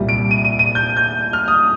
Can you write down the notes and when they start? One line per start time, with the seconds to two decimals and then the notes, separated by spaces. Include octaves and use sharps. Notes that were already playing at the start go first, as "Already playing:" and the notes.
Already playing: C2 A#2 G3
0.09 D7
0.31 D#7
0.45 D#7
0.59 D#7
0.75 G6
0.97 G6
1.33 F6
1.48 D#6